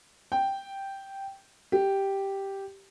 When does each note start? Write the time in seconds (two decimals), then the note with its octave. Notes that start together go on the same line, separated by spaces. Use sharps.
0.32 G5
1.72 G4